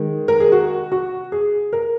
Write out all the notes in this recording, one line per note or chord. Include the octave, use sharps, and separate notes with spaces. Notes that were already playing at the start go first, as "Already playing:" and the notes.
Already playing: D#3 G#3
A#4
G#4
F#4
F#4
G#4
A#4